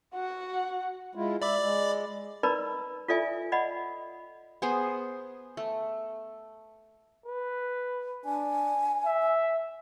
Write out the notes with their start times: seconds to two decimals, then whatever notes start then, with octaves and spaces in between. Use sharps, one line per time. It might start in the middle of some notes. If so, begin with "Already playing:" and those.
0.15 F#4 F#5
1.15 G#3 E4 F4
1.42 D5 E5 B5 D6
1.60 G#3
2.43 D#4 A#4 B4 D5 A#5 B5
3.08 F4 A4 D5 E5 G#5
3.52 D5 D#5 F#5 B5
4.62 B3 G#4 C5
5.57 A3
7.26 B4
8.25 D4 G#5
9.05 E5